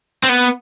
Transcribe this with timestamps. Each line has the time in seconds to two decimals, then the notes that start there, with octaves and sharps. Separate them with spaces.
0.23 C4
0.29 B3